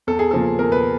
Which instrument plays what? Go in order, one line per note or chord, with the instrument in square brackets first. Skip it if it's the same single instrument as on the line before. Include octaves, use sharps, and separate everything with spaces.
[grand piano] E2 A4
G#4
C#3 F3 A#3 A4
E2 A#4
B4